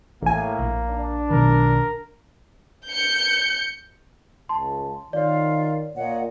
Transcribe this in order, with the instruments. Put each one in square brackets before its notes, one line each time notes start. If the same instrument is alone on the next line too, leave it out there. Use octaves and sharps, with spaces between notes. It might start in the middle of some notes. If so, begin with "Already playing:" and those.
[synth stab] A1 G#5 [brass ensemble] A2 [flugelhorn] A#3
[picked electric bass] A#1
[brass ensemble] D4
[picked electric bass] B1 B2 D#3 [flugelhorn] A#4
[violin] G6 C#7
[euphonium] C#2 [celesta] A5 C6
[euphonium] D#3 [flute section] F4 F5 [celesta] C#5 D5
[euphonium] A#2 [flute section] C#5 D#5 F#5